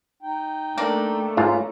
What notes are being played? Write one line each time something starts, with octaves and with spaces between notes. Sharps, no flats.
D#4 G5
A3 A#3 D4
G#2 C#4 F4 B4 A#5